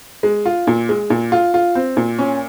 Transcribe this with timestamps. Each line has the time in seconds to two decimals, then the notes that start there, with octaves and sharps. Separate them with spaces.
0.23 G#3
0.46 F4
0.67 A#2
0.89 G#3
1.10 A#2
1.32 F4
1.54 F4
1.75 C4
1.97 A#2
2.19 C#4